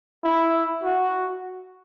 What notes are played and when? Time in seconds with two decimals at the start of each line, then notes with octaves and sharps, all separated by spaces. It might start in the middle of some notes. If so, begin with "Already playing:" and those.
0.24 E4
0.84 F#4